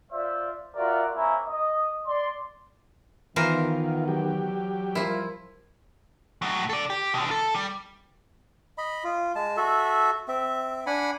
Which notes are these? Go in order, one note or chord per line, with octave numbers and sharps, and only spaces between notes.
F4 C5 D5 E5
F4 F#4 A#4 D5 E5 F#5
A#3 C4 E4 C#5 G#5 A#5
D#5
D5 C6
D#3 E3 B3 F4 A#4 C5
F#3 G4
F3 G3 E4 F4 A#4
A2 F#3
A4 D5
G4
B2 D3
A4
G3
D#5 B5
F4
G#3 A5
F#4 A4 E5
C4 E5
D4 F#5 G#5 B5